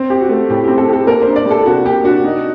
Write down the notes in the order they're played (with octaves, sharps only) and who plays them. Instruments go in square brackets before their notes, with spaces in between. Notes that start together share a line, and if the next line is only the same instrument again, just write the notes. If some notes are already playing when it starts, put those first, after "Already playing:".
Already playing: [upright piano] C4
G4
[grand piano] F#4
[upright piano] A3
[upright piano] A2 [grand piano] G4
[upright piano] C4 [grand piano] G4
[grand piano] A4
[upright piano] G4 [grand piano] A4
[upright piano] A#3 [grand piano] A#4
[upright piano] D4 [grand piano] C5
[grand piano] D5
[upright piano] G3 [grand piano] A4
[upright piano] C3 [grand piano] F#4
[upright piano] A#3 [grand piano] G4
[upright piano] D4 [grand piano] F#4
[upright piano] D#4